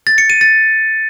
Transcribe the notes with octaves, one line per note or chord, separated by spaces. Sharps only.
A6
C#7
D#7
A6